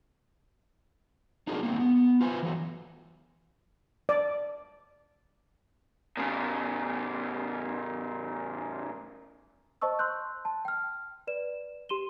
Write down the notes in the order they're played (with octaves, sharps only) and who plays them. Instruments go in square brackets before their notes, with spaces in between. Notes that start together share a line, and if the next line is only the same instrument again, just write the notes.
[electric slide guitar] D4 D#4 F4 F#4 G#4 A#4
A#3 C4 D#4
B3
F4 B4 C5 G#5
E3 F#3 A3
[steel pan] D5
[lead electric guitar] A2 C#3
[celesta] C5 D#5 A5 C#6 E6
C6 E6 F#6 G6
A5
G5 F6
B4 D5 E7
G4 C6 D#7 E7 G7